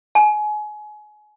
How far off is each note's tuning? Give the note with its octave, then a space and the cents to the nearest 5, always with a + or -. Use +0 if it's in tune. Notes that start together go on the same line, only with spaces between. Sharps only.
G#5 +30